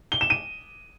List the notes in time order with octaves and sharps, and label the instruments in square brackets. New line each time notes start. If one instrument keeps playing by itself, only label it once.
[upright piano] G7
E7
D#7